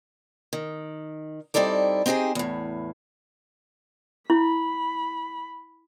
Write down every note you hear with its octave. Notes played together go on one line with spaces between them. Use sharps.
D#3
G3 C4 D#4 E4 A4 D5
C4 D#4 G4 G#4 C5
E2 A2
E4 B5